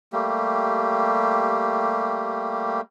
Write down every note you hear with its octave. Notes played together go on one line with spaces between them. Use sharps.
G3 A3 A#3 G4